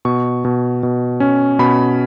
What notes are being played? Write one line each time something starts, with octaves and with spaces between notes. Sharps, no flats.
B2 C#6
B2
B2
C#4
B2 B5